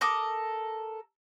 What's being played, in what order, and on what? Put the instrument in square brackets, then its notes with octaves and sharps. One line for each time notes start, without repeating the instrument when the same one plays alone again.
[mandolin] A4 A#4 D6 D#6